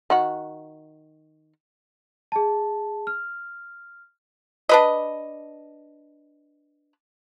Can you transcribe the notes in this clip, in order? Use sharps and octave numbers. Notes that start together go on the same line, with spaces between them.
D#3 F#4 F#5
G#4 A5
F6
D4 B4 D#5